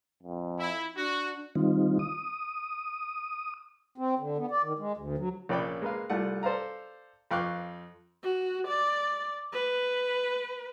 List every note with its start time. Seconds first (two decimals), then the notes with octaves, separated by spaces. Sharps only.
0.23 F2
0.60 E4
0.97 D4 F#4
1.55 D#3 G3 C4 D#4 F4
1.99 D#6
3.98 C4
4.19 D3
4.38 B3
4.51 D5
4.63 D#3
4.79 G#3
4.97 D2
5.18 F#3
5.49 A#1 C#4 D5 G5 B5 D6
5.82 G#3 A#3 B4 F5
6.10 C2 G3 A3 F4 F#5
6.43 A4 C5 D5 F5 A#5
7.31 F2 F5 G5 C#6 D6 F#6
8.23 F#4
8.68 D5
9.53 B4